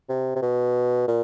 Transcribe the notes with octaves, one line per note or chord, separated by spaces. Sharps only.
C3
C3
B2
A#2